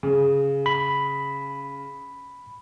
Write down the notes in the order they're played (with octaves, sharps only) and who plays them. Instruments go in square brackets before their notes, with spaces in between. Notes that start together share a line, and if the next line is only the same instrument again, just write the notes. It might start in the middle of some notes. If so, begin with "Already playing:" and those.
[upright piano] C#3
[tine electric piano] B5